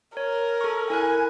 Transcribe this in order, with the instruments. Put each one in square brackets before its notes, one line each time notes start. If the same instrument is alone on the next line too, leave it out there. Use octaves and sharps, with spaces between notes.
[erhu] A#4 [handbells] C#5
[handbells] A4 C#6
[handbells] E4 A#4 F#6 [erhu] G#5